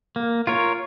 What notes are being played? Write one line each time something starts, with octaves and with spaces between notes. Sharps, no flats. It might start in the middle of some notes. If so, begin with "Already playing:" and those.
A#3
F4 A#4 C#5